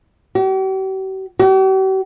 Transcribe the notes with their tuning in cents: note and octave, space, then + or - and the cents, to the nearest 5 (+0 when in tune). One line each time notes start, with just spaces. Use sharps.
G4 -45
G4 -45